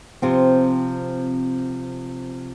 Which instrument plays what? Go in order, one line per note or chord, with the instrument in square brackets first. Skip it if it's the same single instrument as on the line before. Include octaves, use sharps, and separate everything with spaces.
[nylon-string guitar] C3 F3 C4